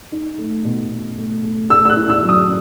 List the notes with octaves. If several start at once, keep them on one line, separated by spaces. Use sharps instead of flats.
D#4
A3
B2
B2
A3
A3
A3 E6
E6
F#6
E4
E6
F#3
D#6